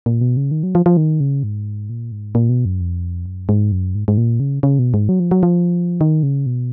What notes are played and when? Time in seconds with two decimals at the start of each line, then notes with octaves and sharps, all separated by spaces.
0.06 A#2
0.21 B2
0.37 C#3
0.51 D#3
0.63 F#3
0.75 F3
0.86 F3
0.97 D#3
1.20 C#3
1.43 G#2
1.90 A#2
2.12 G#2
2.35 A#2
2.49 B2
2.65 F#2
2.81 F2
3.26 F#2
3.49 G#2
3.72 F#2
3.95 G#2
4.08 G#2
4.18 A#2
4.40 C#3
4.63 C#3
4.79 B2
4.94 G#2
5.09 F#3
5.20 F3
5.31 F#3
5.43 F3
6.01 D#3
6.23 C#3
6.46 B2